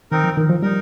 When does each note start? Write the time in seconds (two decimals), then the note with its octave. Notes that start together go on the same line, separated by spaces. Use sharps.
0.11 D#3 C4 D#4 A#4
0.24 F3
0.37 D#3
0.50 F3
0.62 G3 D#4 A#4